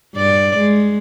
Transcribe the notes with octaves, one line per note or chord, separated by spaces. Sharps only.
G2 D5
G#3